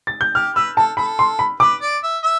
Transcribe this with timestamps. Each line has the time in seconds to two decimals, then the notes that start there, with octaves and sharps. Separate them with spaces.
0.07 A6
0.21 G6
0.35 G4 F6
0.55 B4 E6
0.77 A4 A5
0.97 A4 B5
1.19 C6
1.39 B5
1.60 B4 D6
1.82 D5
2.03 E5
2.24 E5